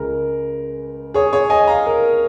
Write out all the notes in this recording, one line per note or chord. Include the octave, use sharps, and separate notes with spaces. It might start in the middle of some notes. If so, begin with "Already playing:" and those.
Already playing: C#2 C#3 A#4
G#4 C#5
G#4 C#5
D#5 G#5
F5 A#5
A#4